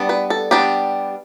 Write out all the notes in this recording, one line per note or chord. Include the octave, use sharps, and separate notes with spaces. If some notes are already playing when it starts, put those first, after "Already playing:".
Already playing: G3 B3 D4
B4
A4
G3 B3 D4 G4